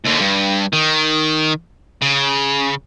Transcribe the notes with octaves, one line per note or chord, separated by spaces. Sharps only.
D#2 D3
G2
D#3
C#3